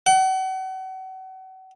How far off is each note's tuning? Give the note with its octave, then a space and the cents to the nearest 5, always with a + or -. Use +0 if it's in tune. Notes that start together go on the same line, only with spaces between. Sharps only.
F#5 +35